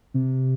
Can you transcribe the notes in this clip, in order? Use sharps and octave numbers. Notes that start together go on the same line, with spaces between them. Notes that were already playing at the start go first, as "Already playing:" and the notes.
C3